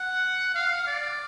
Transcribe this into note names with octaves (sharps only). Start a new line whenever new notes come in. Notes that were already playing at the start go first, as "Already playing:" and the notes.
Already playing: F#5
F5
D5